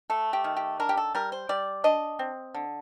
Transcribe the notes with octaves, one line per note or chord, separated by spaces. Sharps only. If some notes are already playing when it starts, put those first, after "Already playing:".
A3 A4
G4
D#3
G4
D4 A#4
G4
A4
G3 A#4
C5
G3 D5
D4 D#5
C4
D3